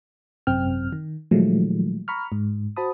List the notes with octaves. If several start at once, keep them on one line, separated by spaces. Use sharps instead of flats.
G#1 F#2 C3 C4 G5 F6
D#3
A#2 D#3 F3 F#3 G#3 A3
A#5 B5 C#6 F6
G#2
F#4 C5 A5 B5 D#6